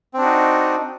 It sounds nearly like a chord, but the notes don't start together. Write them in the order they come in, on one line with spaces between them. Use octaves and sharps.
C4 D4 F#4 D#4